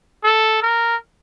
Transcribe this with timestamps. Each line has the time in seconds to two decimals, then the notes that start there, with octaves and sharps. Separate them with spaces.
0.24 A4
0.62 A#4